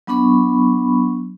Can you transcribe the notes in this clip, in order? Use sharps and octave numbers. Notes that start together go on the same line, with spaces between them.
F#3 B3 D4 B5 C#6